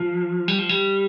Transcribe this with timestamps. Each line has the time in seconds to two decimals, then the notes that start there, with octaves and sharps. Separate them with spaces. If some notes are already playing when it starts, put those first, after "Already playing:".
Already playing: F3
0.48 G3
0.59 F3
0.69 G3